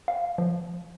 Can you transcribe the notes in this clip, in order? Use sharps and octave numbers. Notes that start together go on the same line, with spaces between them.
F5
F3